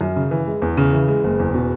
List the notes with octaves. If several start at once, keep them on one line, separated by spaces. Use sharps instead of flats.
F#2
C#3
E3
G#3
E2
C#3
E3
G#3
F#1
E2
B2